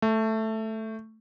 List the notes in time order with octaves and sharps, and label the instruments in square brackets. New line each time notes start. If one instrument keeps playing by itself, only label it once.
[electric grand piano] A3